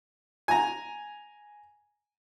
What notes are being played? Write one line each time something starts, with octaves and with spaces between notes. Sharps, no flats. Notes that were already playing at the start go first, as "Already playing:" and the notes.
G#5 A#5